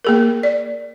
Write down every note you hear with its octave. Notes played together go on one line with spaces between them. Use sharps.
A#3 G#4 A#4
D5